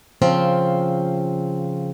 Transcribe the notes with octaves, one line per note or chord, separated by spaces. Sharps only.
C#3 F3 C4